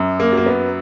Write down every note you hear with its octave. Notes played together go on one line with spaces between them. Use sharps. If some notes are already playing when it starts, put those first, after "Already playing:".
Already playing: F#2
A#3
F#3 A#3
B3